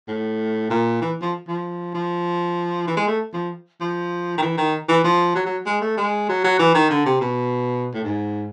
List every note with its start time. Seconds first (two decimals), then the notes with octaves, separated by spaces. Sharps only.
0.08 A2
0.70 A#2
1.01 E3
1.22 F3
1.48 F3
1.94 F3
2.87 E3
2.97 G#3
3.08 A3
3.34 F3
3.81 F3
4.38 D#3
4.42 E3
4.57 D#3
4.89 E3
5.04 F3
5.35 F#3
5.46 F#3
5.66 G#3
5.82 A3
5.97 G#3
6.29 F#3
6.44 F#3
6.59 E3
6.75 D#3
6.90 D3
7.05 C3
7.21 B2
7.94 A2
8.04 G#2